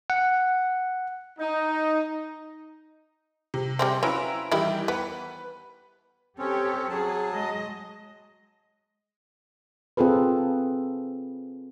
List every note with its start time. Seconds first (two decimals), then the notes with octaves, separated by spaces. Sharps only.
0.10 F#5
1.39 D#4
3.54 C3
3.79 G3 G#3 C4
4.03 F#3 C#4 E4 F4 B4 A#5
4.52 D#3 E3 G3 E4 G4
4.88 B3 B4
6.39 C4 C#4 G4 A4 C#5
6.89 F#3 G#4 A5
7.34 G#3 D#5
9.97 C4 F4 G#4 A4 B4